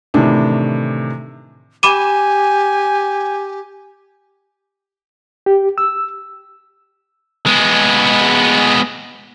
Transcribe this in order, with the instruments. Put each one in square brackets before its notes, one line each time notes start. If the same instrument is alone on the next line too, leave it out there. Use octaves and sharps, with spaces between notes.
[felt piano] A2 C3 D#3 E3 D4
[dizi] G4 [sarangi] G#5 [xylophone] B5 D6 D#7
[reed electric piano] G4
E6
[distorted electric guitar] G#3 B3